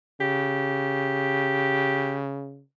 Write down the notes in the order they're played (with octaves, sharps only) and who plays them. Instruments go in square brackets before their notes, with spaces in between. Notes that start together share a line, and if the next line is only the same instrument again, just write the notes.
[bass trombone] C#3 [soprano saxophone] G4